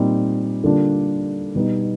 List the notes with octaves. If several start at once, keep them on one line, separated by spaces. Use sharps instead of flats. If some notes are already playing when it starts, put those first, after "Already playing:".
Already playing: A#2 G3 C4 D#4
D3 G3 A#3 D4 F4
B2 G3 B3 D#4